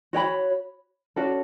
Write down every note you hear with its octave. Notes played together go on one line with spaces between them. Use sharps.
F#4 C#5 G5 B5
C#4 F#4 A4 D5